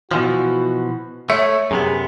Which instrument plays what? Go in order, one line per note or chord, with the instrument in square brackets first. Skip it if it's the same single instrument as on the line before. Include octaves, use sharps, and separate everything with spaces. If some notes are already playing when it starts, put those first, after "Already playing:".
[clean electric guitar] B2 E3 F3 [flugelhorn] F#4
[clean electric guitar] A3 [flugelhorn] C#5 [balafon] E5
[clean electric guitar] F#2 C3 B3 [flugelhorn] G#4